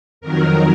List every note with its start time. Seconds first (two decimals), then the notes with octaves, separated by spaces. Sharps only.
0.21 F2 D#3 F#3 A#4